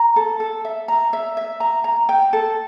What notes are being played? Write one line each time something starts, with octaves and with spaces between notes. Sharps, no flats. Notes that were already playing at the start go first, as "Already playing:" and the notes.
Already playing: A#5
A4
A4
E5
A#5
E5
E5
A#5
A#5
G5
A4